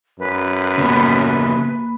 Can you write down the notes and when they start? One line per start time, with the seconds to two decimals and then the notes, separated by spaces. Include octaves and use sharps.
0.19 F#2 B4
0.78 C#3 A#3 B3 B5